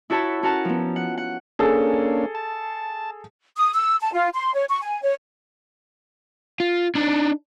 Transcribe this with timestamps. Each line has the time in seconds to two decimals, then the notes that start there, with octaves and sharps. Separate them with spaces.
0.10 E4 F#4 A4 C#5 A5 B5
0.43 C#4 F#4 A#4 F#5 A5
0.65 F3 B3
0.96 F#5
1.17 F#5
1.59 A#3 C#4 D4 G#4 A4
2.35 A5
3.56 D#6
3.74 E6
4.01 A5
4.13 F4
4.34 C6
4.54 C#5
4.70 C#6
4.82 G#5
5.02 C#5
6.60 F4
6.95 D4 D#4